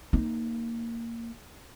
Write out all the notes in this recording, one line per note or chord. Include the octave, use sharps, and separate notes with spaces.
A#3 D#4